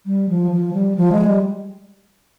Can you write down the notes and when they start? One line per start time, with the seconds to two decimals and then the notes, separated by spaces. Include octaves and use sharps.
0.06 G3
0.29 F3
0.51 F3
0.73 G3
0.96 F3
1.12 G#3
1.27 G3